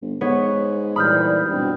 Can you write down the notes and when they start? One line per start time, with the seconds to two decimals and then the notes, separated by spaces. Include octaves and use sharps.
0.02 G1
0.21 G#2 B3 C#5
0.96 A#2 E3 G3 B5 D#6 F6 G6
1.49 G2 B2 C4